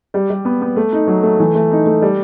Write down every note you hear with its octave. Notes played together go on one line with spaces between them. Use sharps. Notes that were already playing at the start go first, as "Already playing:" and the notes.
G3
G3
B3
B3
A3
D#4
F#3
A3
E3
A3
D#4
A3
G3